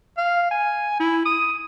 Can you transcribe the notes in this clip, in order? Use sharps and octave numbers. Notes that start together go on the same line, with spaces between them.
F5
G#5
E4
D#6